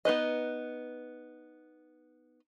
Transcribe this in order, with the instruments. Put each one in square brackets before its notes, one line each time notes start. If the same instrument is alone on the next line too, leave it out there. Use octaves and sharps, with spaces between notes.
[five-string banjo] B3 D#4 B4 D#5